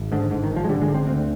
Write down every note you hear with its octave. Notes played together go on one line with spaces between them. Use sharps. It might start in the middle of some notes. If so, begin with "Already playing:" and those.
Already playing: G#1
G#2 D3
G#2 D3
D#3
G#1
F3
G#3
D3 G3
G#3
D3
C4
D2 C4